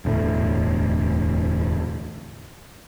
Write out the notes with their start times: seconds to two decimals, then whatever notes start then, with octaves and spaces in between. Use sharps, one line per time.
0.05 E1 D2 A2 A3